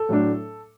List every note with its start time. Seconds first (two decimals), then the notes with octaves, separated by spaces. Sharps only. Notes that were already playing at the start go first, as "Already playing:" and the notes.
Already playing: A4
0.09 A2 F#3 A3 D4